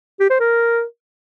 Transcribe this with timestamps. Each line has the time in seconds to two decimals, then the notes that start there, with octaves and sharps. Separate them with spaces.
0.20 G4
0.30 C5
0.40 A#4